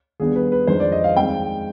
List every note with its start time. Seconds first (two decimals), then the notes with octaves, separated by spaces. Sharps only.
0.20 D#2 D#3 G3 B3 D4 G#4
0.35 B4
0.52 B4
0.67 F2 D#3 G#3 D4 C5
0.80 D5
0.92 D#5
1.04 F5
1.16 D#2 D#3 G#3 C4 G5